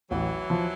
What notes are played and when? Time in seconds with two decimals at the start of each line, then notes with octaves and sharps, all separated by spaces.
0.11 A1 E3 F#3
0.50 F3